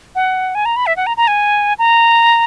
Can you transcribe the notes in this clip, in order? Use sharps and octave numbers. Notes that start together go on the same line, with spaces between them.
F#5
G#5
A#5
B5
E5
F#5
A#5
A#5
G#5
A#5